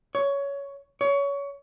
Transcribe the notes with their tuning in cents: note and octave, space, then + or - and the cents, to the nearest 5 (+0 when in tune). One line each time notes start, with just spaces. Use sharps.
C#5 +15
C#5 +25